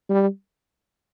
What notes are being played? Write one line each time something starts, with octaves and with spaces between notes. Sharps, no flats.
G3